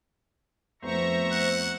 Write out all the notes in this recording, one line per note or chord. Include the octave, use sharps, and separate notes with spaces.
F2 A3 B3 C5 E5 A#5 C#6
F#5